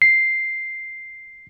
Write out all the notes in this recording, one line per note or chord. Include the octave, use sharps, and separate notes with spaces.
C7